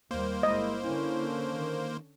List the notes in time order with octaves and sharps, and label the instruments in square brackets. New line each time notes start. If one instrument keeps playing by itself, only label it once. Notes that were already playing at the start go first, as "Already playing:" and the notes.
[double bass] D#2 G3 [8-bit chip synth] A#3 C5
[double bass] G1 E4 [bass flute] G#3 [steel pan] D#5
[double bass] D3 C#4 [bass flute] E4
[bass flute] D#3